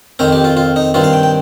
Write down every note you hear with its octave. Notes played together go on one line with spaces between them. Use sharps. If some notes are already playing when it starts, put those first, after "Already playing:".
F2 D#3 C4 A#4
G4
F4
F4
D#4
G2 D#3 C4 F4
F5
G5
G5